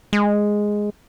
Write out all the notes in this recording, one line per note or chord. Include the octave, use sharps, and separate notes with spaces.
G#3